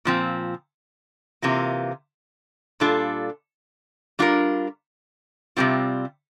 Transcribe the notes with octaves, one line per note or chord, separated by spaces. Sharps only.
A#2 F3 C4
C3 E3 A#3 F4
A#2 G3 D4 F4 A4
G3 D4 F4 A#4
C3 G3 C4 F4